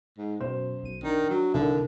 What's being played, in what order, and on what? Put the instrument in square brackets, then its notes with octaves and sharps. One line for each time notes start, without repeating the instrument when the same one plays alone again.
[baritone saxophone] G#2
[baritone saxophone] F#2 [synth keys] B2 [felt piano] C5
[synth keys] B1 D#7
[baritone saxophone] D#3 [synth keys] D4
[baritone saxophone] F#3
[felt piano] C2 D#3 [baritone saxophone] D3